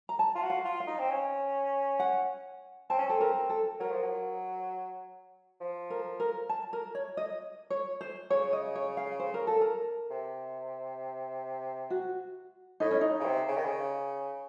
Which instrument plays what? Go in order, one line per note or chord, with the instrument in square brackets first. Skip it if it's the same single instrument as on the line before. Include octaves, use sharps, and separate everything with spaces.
[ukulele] A#5
A5
[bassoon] F4
F#4
[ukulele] F5
[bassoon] F4
[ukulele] F5
[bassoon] D#4
C4
C#4
[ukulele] F#5
[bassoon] C4 [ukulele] A5
[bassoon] C#4
[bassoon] C4 [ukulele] A4
[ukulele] A#4
A4
[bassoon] F#3 [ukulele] A#4
[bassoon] F3
F#3
F3
[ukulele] A#4
A#4
A5
A#4
C#5
D#5
C#5
C5
[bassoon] C#3 [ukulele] C#5
[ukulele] D#5
C#5
F5
C5
A#4
A4
A#4
[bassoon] C3
[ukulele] F#4
[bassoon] A2 [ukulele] D#4
[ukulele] C#4
D#4
[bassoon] C#3
C3
C#3
D#3
C#3